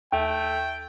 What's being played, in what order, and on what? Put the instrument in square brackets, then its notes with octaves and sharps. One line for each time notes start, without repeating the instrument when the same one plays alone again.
[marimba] D#2 [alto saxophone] A3 [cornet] G5